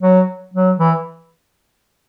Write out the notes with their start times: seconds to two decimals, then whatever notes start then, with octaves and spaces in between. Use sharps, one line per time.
0.02 F#3
0.54 F#3
0.79 E3